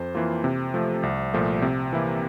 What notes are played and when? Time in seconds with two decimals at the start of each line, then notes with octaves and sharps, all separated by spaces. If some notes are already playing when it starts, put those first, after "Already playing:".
Already playing: F2 C5
0.15 E3 A#3 F4
0.44 C3
0.74 F3 A3
1.03 C2
1.34 A#2 F3 A3
1.62 C3
1.93 E3 A#3 E4